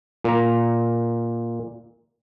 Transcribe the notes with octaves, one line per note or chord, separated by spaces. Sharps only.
A#2 A#5